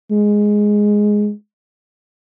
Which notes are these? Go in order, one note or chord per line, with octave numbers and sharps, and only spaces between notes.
G#3